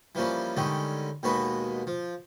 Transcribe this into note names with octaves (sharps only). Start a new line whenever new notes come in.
E3 F3 G3 A#3 C#4
D3 D#3 G3 G#3 C#4
D#2 B2 G#3 F#4 B4
F3